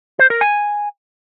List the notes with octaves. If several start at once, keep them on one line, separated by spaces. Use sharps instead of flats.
C5
A#4
G#5